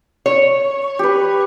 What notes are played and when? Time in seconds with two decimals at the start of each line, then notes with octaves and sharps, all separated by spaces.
0.26 C#5
0.99 G4 B4